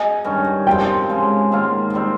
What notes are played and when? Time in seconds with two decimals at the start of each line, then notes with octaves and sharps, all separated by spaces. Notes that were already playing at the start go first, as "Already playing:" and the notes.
Already playing: G#4 D#5
0.24 G2 D#3 G3 C#4
0.66 C3 F3 C4 G5
1.09 C#3 F3 G#3
1.52 G#2 D#3 A#3 F4
1.94 D#3 G3 C4